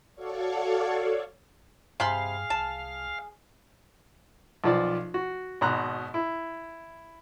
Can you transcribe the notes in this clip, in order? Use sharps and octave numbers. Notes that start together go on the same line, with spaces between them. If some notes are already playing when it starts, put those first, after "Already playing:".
F#4 A4 C#5 D5 F5 C#6
G2 C3 G#4 F5 B5 C6
C2 A5
B1 F3 D5
F#4
G#1 B2 A#5 F#6
E4